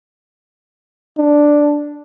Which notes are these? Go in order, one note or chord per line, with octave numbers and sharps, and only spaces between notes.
D4